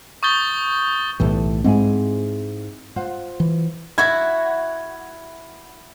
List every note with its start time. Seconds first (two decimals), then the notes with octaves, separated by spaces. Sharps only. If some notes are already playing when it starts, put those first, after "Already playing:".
0.23 C#6 D#6 G6 A6 G7
1.20 B1 A2 E3 G4 A4
1.64 G#2 C4 E4 G#4
2.96 F4 C5 F#5
3.40 E3
3.98 E4 F#4 G#6